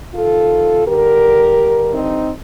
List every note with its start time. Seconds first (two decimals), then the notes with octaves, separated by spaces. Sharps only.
0.15 F2 C3 D#3 F4 A4
0.85 G2 D3 G4 A#4
1.57 G2 D3
1.93 C4 D#4